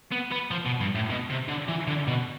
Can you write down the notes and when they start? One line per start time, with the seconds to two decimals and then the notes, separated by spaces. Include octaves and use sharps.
0.12 B3
0.32 B3
0.51 F3
0.66 B2
0.81 G2
0.95 A2
1.10 B2
1.30 C3
1.48 D3
1.68 E3
1.87 D3
2.08 B2